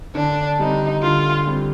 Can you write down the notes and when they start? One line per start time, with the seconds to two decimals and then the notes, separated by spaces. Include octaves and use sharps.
0.15 D3 D4
0.59 G3 C4 D#4
1.02 D3 F4
1.47 G3 C4